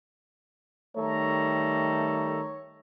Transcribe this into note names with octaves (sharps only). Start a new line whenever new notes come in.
D#3 G3 A3 A4 C#5 A#5